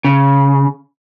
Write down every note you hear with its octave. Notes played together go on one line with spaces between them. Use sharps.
C#3